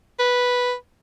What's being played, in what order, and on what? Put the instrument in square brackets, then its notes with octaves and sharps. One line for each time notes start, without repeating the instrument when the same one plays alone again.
[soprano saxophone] B4